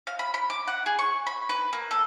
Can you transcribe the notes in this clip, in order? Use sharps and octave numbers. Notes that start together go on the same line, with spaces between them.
F5
B5
B5
D6
F#5
G#4
C#6
B5
B4
A#3
A4